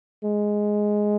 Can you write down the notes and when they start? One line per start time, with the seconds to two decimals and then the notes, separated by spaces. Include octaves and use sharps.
0.24 G#3